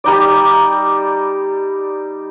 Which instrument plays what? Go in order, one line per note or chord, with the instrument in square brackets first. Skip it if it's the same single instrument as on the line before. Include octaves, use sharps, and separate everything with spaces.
[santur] G3 D#4 D5